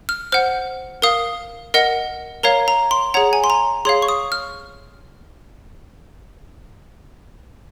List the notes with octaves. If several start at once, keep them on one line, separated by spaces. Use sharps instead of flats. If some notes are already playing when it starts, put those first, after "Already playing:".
F6
C5 F#5 F6
A#4 F5 D#6
A#4 D#5 F#5
A#4 C#5 F5 A#5
A#5
C6
G#4 C#5 F#5 A#5
G#5
C6
A#5
G#4 C#5 F5 C6
C#6
D#6
F6